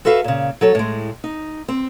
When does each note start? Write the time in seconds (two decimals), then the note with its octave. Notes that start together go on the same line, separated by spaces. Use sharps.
0.05 F#4 A4 B4 E5 F5
0.24 A#2 C#3
0.61 F#3 A4 C#5
0.75 A2 G#3
1.24 D#4
1.68 C4